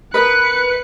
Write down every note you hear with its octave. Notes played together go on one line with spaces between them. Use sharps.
A#4 B4 D#5 F#6 C#7